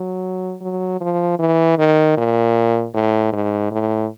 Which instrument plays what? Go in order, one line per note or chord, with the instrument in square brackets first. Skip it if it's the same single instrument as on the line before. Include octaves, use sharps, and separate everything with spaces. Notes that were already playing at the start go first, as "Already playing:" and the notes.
Already playing: [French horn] F#3
F#3
F3
E3
D#3
A#2
A2
G#2
A2